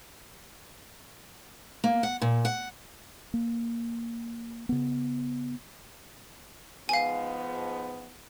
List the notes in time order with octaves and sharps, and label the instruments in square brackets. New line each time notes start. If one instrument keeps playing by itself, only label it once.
[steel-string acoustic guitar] A#3
F#5
A#2
F#5
[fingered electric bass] A#3
C#3 B3
[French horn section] G#2 F3 B3 [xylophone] F5 G#5